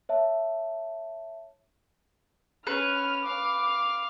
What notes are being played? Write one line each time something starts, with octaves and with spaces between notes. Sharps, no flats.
C#5 E5 A5
C#4 B4 F6
F5 D6